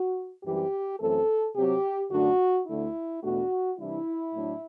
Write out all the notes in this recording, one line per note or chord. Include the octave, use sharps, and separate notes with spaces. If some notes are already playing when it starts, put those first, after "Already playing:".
Already playing: F#4
F#2 E3 G3 C4 G4
F#2 E3 A3 C4 A4
C3 F#3 C4 G4
F#2 D3 A3 D4 F#4
D2 D3 A3 E4
E2 B2 A3 D4 F#4
C3 E3 G3 D4 E4
A2 F#3 A3 D4